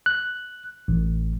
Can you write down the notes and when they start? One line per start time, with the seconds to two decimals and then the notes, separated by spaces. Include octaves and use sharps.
0.06 F#6
0.88 A1